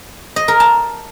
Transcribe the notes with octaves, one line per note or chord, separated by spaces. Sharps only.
D#5
A#4
A5